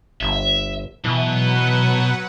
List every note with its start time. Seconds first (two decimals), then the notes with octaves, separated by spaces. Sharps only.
0.21 G1 E5
1.04 B2 E3 F#3 B4 F#5